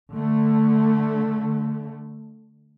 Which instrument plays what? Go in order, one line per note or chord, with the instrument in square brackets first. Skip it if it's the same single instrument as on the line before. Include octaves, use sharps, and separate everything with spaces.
[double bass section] D3 A3